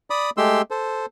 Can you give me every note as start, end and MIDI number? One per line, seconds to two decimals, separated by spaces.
0.10 0.30 74
0.10 0.30 83
0.10 0.30 87
0.37 0.62 56
0.37 0.62 57
0.37 0.62 67
0.37 0.62 84
0.37 0.62 88
0.71 1.06 69
0.71 1.06 72